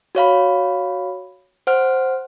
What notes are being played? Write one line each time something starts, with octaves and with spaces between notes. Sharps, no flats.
F#4 C#5 F5 B5
C5 F#5 F6